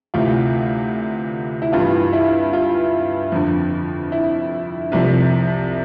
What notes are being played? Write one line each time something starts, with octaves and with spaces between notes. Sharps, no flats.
D2 C3 E3 F4
E4
G2 E3 F4
E4
F4
F2 D3 F3
E4
C2 C3 F3